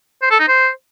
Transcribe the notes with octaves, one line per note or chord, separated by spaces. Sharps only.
C5
A4
D#4
C5